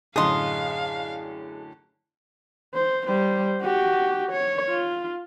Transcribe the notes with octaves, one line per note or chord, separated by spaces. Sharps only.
F#2 A2 D3 G#4 D#5 F5 C6 D#6
C5
G3 C5
F#4 G4
C#5
F4